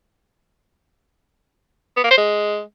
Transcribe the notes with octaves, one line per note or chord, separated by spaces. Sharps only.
B3
A#3
C5
G#3